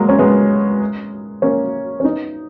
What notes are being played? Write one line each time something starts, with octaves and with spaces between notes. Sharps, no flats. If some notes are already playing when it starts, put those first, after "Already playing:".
Already playing: F#3 G#3 A#3
C#4
G#3 B3
A#3 C#4
C#4
B3 D#4